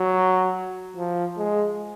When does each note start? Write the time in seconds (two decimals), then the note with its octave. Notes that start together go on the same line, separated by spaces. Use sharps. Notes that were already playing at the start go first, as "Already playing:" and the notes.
Already playing: F#3
0.97 F3
1.38 G#3